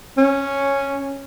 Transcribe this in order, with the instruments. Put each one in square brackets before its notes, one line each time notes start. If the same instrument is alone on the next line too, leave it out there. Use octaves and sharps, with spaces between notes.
[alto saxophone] C#4